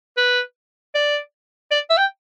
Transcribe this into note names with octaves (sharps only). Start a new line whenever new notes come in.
B4
D5
D5
E5
G5